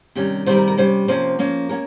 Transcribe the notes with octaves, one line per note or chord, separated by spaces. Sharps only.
C3 D#3 G3 C#4
C3 D#3 G3 C4 C5
A#4
A#4
C3 G3 C#4 C5
C3 F3 A#3 C#4 C5
F3 A#3 C#4
A#3 C#4 A#4